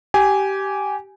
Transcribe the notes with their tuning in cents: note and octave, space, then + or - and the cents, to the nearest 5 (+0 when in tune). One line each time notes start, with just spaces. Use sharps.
G4 -15 G#5 +0